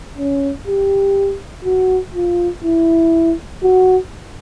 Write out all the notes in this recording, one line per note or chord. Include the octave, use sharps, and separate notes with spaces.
C#4
G4
F#4
F4
E4
F#4